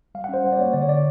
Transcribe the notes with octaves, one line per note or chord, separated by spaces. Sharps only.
G3 F5
F#5
C#4 C5
G3
D5
A#3 C#5
D3 D5
C#5
D3 D5